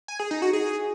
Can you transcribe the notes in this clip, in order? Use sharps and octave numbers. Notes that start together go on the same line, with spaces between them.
G#5
G#4
D#4
F#4
G#4